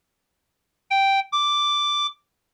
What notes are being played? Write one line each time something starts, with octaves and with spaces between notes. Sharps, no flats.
G5
D6